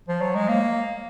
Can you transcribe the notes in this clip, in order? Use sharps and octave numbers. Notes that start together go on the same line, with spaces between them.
F3
F#3
G#3
A#3